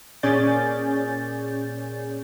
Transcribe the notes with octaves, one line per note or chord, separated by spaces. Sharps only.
A#2 C#4 G#4 D5 G6 A6